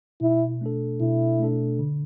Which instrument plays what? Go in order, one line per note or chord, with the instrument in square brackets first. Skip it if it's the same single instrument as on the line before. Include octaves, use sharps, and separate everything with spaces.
[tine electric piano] B2 [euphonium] E4
[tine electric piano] A3 D4 A4
[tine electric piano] B2 [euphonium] E4
[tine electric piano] A3 D4 A4
D3